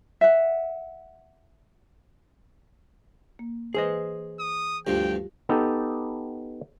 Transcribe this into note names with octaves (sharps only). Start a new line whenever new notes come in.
E5 F#5
A#3
E3 G#4 B4 C5 D#5
D#6
D2 G2 F3 G3 F4 G4 G5
B3 D#4 G4 A4